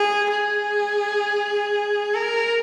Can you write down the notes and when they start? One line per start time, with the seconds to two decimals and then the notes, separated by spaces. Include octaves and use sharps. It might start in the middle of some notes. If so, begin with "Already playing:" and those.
Already playing: G#4
0.30 G#4
2.15 A#4